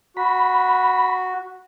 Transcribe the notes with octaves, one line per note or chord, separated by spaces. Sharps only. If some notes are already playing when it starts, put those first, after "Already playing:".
F#4 B5